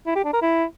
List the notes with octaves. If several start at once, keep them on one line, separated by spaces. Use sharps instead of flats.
E4
G4
D4
A#4
E4